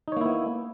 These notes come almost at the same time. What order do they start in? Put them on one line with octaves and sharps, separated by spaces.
D#4 C#5 A#3 E4 B3